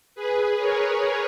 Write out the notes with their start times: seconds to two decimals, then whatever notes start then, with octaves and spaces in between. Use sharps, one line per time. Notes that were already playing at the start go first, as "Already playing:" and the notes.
0.15 G#4 B4
0.58 A#4 C#5